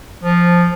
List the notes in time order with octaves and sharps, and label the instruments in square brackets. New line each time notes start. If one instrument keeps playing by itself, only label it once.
[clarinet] F3